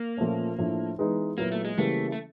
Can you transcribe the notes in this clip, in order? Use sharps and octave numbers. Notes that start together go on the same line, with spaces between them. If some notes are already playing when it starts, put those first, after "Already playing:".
Already playing: A#3
A#2 F3 A3 C#4
A2 F3 A3 D4
E3 G#3 B3 D#4
A#2 F#3 A#3 B3 E4
A3
G#3
C#3 E3 G3 A3 A#3
A3